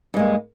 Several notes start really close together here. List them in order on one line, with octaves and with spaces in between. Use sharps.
G2 G#3 A#3